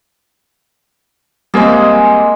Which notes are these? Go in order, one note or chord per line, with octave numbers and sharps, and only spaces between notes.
G3 G#3 A#3 C4 G#4